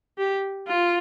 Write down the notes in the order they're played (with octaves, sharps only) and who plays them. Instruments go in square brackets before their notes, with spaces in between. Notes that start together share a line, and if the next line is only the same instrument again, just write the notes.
[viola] G4
F4